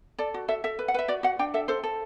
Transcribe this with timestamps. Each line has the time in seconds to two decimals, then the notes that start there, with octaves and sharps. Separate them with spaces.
0.18 A4 D5
0.34 F#4
0.48 A4 E5
0.64 A4 E5
0.79 B4
0.88 F#5
0.94 B4 E5
1.08 F#4 D5
1.23 F#4 F#5
1.39 D4 G5
1.54 A4 E5
1.68 A4 C5
1.83 A4